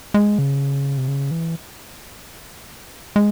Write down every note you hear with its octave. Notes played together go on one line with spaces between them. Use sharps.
G#3
C#3
C3
C#3
E3
G#3